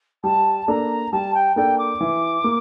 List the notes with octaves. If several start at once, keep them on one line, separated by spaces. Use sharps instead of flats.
G3 A5
A#3 D4 A4 D5 A#5
G3 A5
G5
A#3 D4 A4 D5 G5
D6
E3
A#3